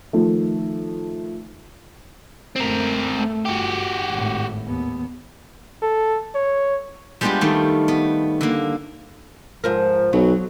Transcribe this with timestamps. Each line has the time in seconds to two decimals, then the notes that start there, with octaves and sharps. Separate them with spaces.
0.13 D#3 F3 A3
2.56 F#2 A3 C4 A#4
3.13 A3
3.45 G1 F#4 G4
4.10 G#1 A2
4.66 D#2 B3
5.82 A4
6.35 C#5
7.21 G3 G#3 B3 D4 F4 G4
7.41 D#3 G3 A3
7.88 B3
8.41 D3 A#3
9.64 G#2 F3 A#4
10.13 B1 F#3